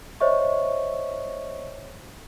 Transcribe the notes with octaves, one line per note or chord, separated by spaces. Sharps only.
C5 C#5 D#5 E5 C#6